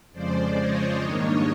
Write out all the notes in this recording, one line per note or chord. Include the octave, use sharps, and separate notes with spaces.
F2 C#3 F3 G#3 C5 D5
C#5 D#5
G#2 D#3 G3 A#3 D4